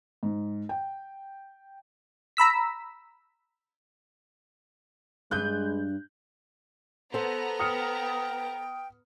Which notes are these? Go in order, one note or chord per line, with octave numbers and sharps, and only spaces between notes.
G#2
G5
A#5 B5 E6 B6
G2 G#3 B4 F#6 G6
B3 A4 C5 A#5
G5 D#6 F6 C#7